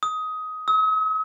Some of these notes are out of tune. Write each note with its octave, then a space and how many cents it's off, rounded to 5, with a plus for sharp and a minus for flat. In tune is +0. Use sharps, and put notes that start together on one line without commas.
D#6 +15
D#6 +45